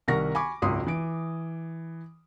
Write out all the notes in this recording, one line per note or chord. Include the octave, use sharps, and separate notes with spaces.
C2 D#3 A#4 F#5 C#6 A#6
G#5 B5 C#6 D6
G#1 C#2 F#2 C6 D#6
E3 D7